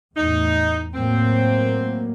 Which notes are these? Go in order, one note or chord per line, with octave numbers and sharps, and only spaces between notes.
E2 A2 D#4
A2 F#3 A#3 C4